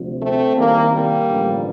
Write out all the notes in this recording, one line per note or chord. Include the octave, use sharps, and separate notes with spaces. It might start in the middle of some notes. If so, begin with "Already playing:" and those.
Already playing: D2 C3 F3
A3 C4
C2 C3 D#3 G3 A#3
G3 A#3
A1 G2 D3 F3